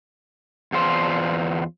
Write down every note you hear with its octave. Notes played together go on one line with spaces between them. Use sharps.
E2 F4 C5